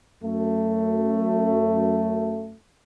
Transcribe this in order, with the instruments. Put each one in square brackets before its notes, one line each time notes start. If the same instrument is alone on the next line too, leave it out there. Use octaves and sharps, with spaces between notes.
[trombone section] F#2 A3